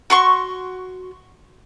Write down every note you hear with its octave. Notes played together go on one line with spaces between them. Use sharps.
F#4 C6 C#6